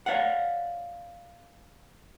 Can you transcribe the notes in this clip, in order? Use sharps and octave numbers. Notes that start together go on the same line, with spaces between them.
C#5 D5 F5 F#5